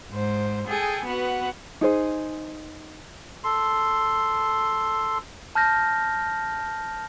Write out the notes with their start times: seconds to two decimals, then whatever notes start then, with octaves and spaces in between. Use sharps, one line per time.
0.11 G#2 C5
0.67 G#4 A4 G5 G#5
1.05 B3 F#4 B4 F#5
1.81 D#4 G#4 C5
3.44 A4 C6
5.55 A5 F6 G6 A#6